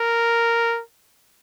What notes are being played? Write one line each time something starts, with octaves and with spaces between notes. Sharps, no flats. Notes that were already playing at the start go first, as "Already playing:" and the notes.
Already playing: A#4